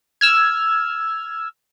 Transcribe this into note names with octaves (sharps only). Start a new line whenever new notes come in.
E6 F6 G#6